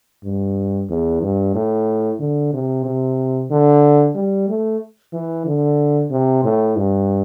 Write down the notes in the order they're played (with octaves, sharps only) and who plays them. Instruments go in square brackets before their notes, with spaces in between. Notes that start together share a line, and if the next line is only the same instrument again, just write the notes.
[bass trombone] G2
E2
G2
A2
D3
C3
C3
D3
G3
A3
E3
D3
C3
A2
G2